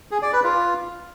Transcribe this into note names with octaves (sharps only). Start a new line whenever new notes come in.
G#4
D5
B4
F4